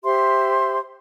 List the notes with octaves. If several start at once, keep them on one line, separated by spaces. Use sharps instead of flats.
G4 C5 E5 C6